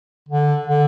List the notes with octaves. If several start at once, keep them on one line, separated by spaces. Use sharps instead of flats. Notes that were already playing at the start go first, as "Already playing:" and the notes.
D3
D3